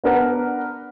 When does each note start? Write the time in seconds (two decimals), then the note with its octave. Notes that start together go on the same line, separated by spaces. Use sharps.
0.04 B3 D4 A#4 B4 F#5